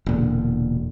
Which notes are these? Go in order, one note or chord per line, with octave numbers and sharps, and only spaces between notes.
E1 A#2 D3